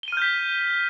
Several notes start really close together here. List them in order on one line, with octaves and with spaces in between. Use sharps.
G7 D#7 F6 G6 B6